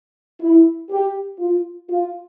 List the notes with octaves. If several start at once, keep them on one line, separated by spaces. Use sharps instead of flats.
E4
G4
F4
F4